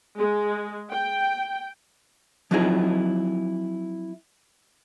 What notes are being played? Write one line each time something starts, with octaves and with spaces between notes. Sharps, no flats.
G#3
G5
F3 F#3 C4 D#4 E4 G#4